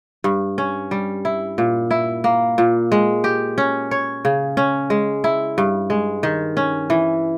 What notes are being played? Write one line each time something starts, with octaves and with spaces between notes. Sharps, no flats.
G2
C#4
G3
E4
A#2
E4
A#3
A#2
G#3
G4
C#4
C#5
C#3
C#4
G#3
E4
G2
G#3
D#3
C#4
E3